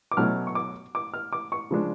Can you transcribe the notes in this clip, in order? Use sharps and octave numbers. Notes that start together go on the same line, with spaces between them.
D6
B2 F#3 A3 C#4 F6
C#6
D6
D6
F6
D6
C#6
C#3 F3 G#3 D4